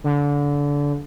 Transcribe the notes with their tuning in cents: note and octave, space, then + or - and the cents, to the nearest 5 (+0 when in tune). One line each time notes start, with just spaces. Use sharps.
D3 -25